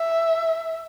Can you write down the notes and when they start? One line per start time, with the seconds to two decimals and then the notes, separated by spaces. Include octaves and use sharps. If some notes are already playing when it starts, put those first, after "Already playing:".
Already playing: E5